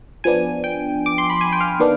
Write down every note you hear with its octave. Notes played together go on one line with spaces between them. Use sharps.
F3 B3 D4 G#5
G5
D6
C6
B5
G#5
G5
F5
D#3 B3 D4